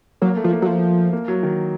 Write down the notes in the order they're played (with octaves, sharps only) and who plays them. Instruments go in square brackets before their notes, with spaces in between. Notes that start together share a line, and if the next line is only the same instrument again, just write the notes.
[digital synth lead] F#3 [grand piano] A#3
[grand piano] A3
[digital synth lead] F3
[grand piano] A#3
[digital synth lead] F#3
F3
[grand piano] A#3
F#3
D#3